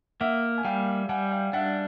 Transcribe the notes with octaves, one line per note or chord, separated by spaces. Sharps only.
A#3 E5 F#5
G#5
G3 F5 G5
G3 F#5 G#5
F5 G5
D4 E5 F#5